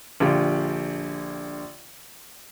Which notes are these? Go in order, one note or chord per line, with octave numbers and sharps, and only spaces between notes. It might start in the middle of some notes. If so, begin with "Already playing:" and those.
A#1 D3 F4 G4 D5